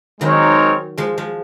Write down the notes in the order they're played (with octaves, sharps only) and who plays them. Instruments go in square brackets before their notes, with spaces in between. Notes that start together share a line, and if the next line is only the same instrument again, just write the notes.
[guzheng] D#3 F#3 [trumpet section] G#3 C4 D#4 A#4 C#5
[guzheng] F3 G#3
F3 G#3